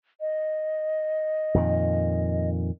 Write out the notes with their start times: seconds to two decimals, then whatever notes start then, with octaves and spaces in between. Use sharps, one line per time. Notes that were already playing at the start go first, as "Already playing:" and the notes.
0.21 D#5
1.54 F2 A#2 D#3